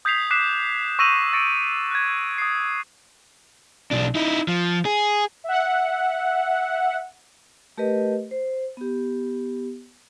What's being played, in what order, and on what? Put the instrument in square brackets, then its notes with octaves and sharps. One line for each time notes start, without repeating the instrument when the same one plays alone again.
[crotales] D#6 G6 G#6 B6 C7 F7
D6 F#6 B6 C7 E7
C#6 E6 A#6 D#7 F7 F#7
C#6 A6 A#6 C#7 D7
F#6 G#6
D#6 C7
[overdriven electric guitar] B1 D4
D#4 E4
F3
G#4
[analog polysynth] E5 F#5
[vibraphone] A3 G4 A#4 B4 D#5
C5
B3 G4